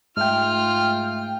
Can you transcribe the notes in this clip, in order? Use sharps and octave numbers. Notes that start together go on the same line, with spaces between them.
G#2 A3 F4 E5 G5 F6